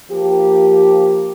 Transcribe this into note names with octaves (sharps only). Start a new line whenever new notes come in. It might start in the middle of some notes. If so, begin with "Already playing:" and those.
F3 A#3 G4